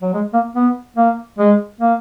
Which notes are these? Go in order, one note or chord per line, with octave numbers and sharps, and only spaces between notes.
F#3
G#3
A#3
B3
A#3
G#3
A#3